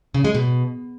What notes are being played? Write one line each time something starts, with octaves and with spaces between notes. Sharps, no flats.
C#3
G#3
B2